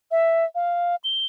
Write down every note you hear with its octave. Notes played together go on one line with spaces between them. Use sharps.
E5
F5
G7